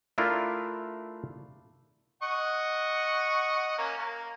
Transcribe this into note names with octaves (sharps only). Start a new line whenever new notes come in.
A3 D4 E4 F4 A#4
D#5 F#5 C#6
A#3 C#4
A#3